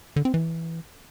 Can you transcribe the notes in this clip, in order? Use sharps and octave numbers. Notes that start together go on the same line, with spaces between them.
D3
C4
E3